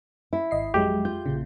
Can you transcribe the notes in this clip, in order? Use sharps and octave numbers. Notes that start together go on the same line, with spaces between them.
E4
G#1 D#5 C7
F2 F#3 G#3 G4
F4 G6
A#1 A#2 C#3